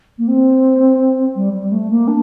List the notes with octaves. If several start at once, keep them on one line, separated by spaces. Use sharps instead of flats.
A#3
C4
G3
G3
A3
A#3
D4